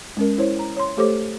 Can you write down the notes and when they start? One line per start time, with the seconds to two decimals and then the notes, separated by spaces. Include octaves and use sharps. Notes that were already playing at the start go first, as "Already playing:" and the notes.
0.17 G#3 C#4 A#4
0.38 E4 C5 C#5
0.59 A#5
0.77 C#5 C6
0.97 A3 G4 A4 C5 C#5 D6